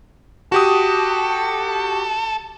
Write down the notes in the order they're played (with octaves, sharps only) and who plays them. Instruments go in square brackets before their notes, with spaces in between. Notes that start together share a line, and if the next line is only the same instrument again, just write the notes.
[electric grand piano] F#4 G4 D#6 [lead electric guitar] A4